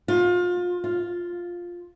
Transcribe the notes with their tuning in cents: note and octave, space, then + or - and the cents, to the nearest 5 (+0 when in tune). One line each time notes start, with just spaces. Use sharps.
F4 +30
F4 +5